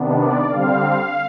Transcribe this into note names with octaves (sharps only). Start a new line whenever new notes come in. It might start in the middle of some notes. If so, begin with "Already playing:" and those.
Already playing: C3 D#3 B3 D4
D5
D3 G3 C4 F5